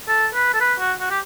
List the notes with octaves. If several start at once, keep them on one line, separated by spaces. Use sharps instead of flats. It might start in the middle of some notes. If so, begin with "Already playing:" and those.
A4
B4
A4
B4
F#4
F#4
G4